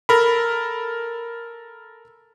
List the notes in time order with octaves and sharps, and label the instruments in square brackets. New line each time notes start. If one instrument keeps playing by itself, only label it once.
[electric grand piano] A4 A#4 B5